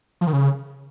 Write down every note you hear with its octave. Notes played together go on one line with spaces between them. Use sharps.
F3
D#3
C#3